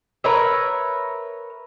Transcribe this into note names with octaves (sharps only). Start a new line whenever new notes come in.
A#4 B4 C#5 E5